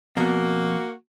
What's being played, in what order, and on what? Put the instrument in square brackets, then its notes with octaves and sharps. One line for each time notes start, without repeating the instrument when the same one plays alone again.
[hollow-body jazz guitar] F2 B2 [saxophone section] A#3 F#4